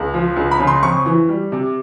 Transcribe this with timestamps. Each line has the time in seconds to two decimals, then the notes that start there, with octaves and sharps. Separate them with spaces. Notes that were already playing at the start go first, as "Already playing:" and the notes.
Already playing: C#2
0.14 F3
0.36 C#2
0.51 B5
0.59 C#3
0.67 C6
0.83 F2 C#6
1.06 E3
1.29 G3
1.52 C3